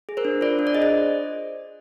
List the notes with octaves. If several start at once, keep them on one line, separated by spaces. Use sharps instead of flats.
G#4
A#4 C5
D4
F4 C5 D5
D4
D5
G#4 D#5
C5 D5